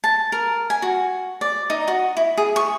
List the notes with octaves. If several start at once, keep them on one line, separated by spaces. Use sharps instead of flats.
A5
A#4
G#5
F#4
D5
D#4
F#4
E4
G#4
C#6